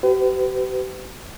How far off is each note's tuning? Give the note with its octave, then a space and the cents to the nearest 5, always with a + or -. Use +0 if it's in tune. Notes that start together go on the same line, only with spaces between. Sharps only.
G4 -40 B4 +40